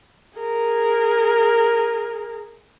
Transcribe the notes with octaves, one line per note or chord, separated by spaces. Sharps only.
G#4 A#4